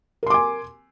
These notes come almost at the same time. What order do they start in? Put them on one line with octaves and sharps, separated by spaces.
A#4 C6 D6 G#5